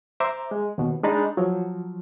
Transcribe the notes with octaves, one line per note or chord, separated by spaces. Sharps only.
C5 E5 A#5 D6
G#3
D#2 B2
G#3 D4 D#4 A#5 B5 A6
F3 F#3